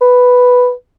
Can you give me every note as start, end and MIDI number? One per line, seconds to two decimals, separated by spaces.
0.01 0.72 71